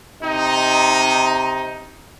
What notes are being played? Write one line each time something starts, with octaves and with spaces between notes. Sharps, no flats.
C3 D#4